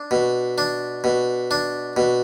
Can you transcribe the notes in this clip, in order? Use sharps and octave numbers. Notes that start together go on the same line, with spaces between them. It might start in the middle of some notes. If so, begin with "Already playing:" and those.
Already playing: D4
B2
D4
B2
D4
B2